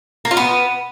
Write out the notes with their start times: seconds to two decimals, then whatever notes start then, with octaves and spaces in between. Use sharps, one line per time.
0.25 A#3
0.31 F4
0.37 B3